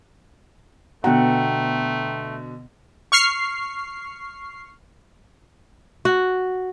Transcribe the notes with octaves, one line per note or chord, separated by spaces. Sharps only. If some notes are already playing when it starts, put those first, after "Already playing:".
B2 D3 A3 B3 F#5 G5 A#5
C#6 F6 C7
F#4